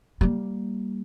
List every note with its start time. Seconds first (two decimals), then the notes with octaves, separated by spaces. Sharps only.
0.21 G3 A#3